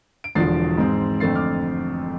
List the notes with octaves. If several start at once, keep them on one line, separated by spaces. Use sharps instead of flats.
D7
E1 E2 D3 F3 A6 C7
G#2 G#3 C4
F2 D3 A3 C4 A6 C7
D6 F6